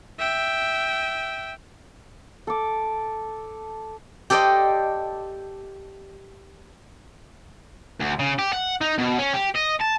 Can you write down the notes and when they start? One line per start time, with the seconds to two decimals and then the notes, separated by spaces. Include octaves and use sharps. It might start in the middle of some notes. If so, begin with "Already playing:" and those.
0.19 E5 G5
2.47 A4 D6
4.30 G4 A4 C5 D5 D#5
8.00 D2
8.19 C#3
8.39 G4
8.53 F#5
8.81 D#4
8.98 B2
9.18 C#4
9.33 G4
9.55 D#5
9.80 A5